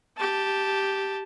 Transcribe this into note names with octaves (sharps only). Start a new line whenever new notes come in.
G4 A5